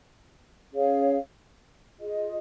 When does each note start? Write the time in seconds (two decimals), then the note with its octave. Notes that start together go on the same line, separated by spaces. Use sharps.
0.72 C#4 G#4 C#5 F5
1.99 F4 G#4 D#5